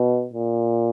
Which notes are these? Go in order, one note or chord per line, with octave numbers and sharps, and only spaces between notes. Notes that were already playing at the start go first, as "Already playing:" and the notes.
Already playing: B2
A#2